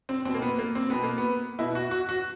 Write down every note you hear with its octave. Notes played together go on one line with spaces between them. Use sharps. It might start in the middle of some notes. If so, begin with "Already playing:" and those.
C4
B2 C4
A#3
B3
A#3
C4
B2 B3
A#3
B3
B2 E4
F#4
F#4
F#4